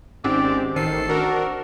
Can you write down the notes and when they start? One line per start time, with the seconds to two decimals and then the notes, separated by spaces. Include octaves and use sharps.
0.24 G#1 G#3 C4 C#4 D#4 G4 D5
0.76 A1 D#3 D#4 A4 C5 C7
1.09 D4 F#4 A#4